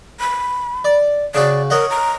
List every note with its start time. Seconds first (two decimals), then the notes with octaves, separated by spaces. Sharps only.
0.20 B5
0.85 D5
1.35 C#3 F#4 D5
1.70 A#4 C#5 D#5 F#5
1.90 A#5